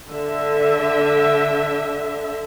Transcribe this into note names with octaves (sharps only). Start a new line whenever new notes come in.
D3 E5